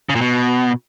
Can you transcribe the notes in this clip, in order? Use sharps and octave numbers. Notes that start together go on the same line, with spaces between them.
C#3
A#2
B2